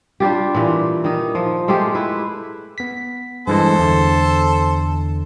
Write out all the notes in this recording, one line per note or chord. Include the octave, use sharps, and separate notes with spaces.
G3 D4 F4 G4
A#2 E3
D#3 D#4
F3
G#3 A3 F4 G4
E4 B4
B3 B6
G2 E3 G#3 A4 C5
E2 D3